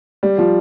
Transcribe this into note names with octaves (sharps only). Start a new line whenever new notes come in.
G3
F3